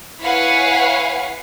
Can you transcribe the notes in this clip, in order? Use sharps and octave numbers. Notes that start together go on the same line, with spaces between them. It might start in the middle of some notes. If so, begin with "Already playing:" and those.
E4 B4 C#5 F5 F#5 G#5